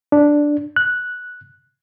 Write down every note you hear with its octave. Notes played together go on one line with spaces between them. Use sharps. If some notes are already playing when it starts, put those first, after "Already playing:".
D4
F#6